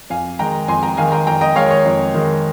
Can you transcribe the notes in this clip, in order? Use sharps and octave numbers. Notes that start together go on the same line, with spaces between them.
F2 F5 G#5
D#3 G#3 G5 A#5
F2 G#5 C6
G5 A#5
D#3 G#3 F5 G#5
G5 A#5
F2 G5 A#5
D#5 G5
D#3 G#3 C#5 F5
C#5
F2
D#3 G#3